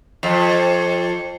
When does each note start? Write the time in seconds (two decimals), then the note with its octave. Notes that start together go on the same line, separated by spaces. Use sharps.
0.23 F2